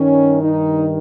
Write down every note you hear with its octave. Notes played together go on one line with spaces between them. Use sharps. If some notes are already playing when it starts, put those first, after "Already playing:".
Already playing: G2 D#3 C#4
D#4